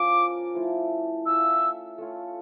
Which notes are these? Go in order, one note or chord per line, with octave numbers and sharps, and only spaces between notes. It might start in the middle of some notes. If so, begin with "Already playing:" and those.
Already playing: F3 C#4 F4 A#4 D6
F3 A3 E4 A4
C#4 F4 C#5 E5 E6
A3 C#4 F4 C#5